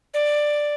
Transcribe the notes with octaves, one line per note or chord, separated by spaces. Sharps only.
D5